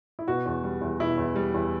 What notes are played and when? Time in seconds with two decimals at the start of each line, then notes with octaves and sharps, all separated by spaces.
0.19 E4
0.28 B2 F#4
0.46 E2
0.64 G3
0.81 E2
1.00 B2 E4
1.18 E2
1.36 G3
1.54 E2